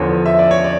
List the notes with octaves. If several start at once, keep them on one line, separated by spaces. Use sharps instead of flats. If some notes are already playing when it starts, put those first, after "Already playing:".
Already playing: E2 D3 F3 C#5
E5
D5
C#5
D5